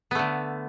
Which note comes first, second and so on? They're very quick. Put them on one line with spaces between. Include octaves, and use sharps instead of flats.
B3 A3 D3